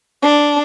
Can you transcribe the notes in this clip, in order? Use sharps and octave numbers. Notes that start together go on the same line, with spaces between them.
D4